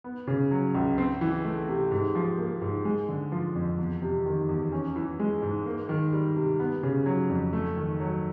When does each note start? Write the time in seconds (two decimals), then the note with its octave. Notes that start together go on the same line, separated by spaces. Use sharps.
0.04 B3
0.27 C#3
0.51 F#3
0.74 C#2
0.98 C4
1.21 E3
1.45 A3
1.68 C3
1.91 G#2
2.15 F3
2.38 A#3
2.62 G#2
2.85 G#3
3.09 D3
3.32 F3
3.55 F2
3.78 E2
4.02 C3
4.26 D#3
4.49 E2
4.72 C#4
4.96 E3
5.19 G#3
5.42 G#2
5.66 A#3
5.89 D#3
6.13 G3
6.36 C3
6.60 B3
6.83 C#3
7.06 F#3
7.30 F2
7.53 A3
7.77 D#3
8.00 F#3